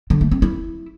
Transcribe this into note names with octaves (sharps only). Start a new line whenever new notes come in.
D3
A3
C4
E4